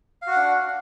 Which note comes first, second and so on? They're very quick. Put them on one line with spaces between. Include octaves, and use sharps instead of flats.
F5 F#4 F#5 D4